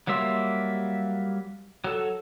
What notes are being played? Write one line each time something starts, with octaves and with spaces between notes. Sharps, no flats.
F#3 G3 A#3 E5 C6
F#3 A4